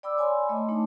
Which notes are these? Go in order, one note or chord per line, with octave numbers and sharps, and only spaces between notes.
D5 G5 B5 D6 E6
C#5 G#5 B5 C6
A3 D#5
A3 D4 D#4